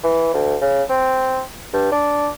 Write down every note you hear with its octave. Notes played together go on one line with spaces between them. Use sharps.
E3
D2
C#3
C4
G2
D4